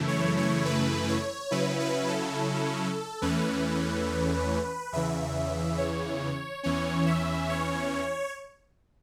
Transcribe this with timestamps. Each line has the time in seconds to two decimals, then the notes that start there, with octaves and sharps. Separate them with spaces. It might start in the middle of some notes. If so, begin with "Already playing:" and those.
Already playing: F#2 C#3 E3 A3 E4
0.08 C#5
0.37 C#5
0.65 B4
1.09 C#5
1.51 C#3 F#3 C#4 E4 B4
1.80 B4
2.08 A4
3.22 E2 E3 A3 C#4 B4
4.92 E2 C#3 E3 E5
5.78 C#5
6.63 E2 E3 C#4 C#5
7.06 E5
7.49 C#5